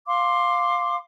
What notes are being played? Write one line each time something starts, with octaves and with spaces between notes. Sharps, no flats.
F5 C6 D6